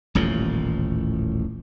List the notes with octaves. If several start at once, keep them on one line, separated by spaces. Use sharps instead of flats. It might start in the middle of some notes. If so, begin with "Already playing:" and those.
D#1 A1 A2 F3